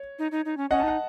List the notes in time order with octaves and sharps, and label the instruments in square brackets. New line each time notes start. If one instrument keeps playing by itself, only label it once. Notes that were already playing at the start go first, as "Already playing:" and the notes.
Already playing: [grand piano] C#5
[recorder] D#4
D#4
D#4
C#4
[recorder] C#4 [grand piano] D#5 F#5
[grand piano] A5
[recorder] D#4 [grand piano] F#5